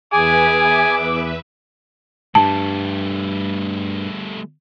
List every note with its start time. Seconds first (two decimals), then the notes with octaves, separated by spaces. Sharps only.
0.13 E2 G#4 B4 E5 G#5 D6
2.35 G2 G3 A3 A5